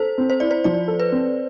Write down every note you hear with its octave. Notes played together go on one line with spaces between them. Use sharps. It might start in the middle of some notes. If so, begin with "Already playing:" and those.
Already playing: A4 C5
C4
C5
E4 D5
C5
F3 D5
A4
B4
C4